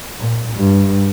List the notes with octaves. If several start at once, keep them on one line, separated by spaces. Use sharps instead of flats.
A#2
G2